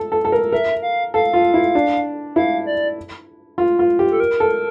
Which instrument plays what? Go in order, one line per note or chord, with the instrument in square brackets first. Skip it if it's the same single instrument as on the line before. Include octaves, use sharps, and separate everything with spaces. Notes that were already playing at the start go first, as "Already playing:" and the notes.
Already playing: [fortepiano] A4
A4
A4
A#4
[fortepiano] A#4 [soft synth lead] E5
[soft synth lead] F5
[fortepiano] A4 [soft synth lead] F5
[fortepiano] F4
E4
D4
[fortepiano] E4 [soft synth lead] F5
[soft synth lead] D5
[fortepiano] F4
F4
G4
[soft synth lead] A4
A#4
[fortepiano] A4